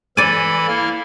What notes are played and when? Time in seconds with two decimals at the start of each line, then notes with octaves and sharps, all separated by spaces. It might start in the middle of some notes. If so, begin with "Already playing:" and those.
0.17 E3 A4 D5 G#5 B5
0.68 A#3 E4 F6